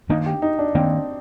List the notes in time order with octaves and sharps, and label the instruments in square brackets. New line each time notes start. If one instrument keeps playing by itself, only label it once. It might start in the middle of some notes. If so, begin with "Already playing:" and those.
[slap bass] D#3 A#3 D4 [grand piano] D#4
[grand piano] G4
D#4
D4
[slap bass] D#3 A#3 D4 [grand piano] C4